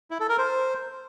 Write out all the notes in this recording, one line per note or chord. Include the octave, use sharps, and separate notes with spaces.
E4
A4
A#4
C5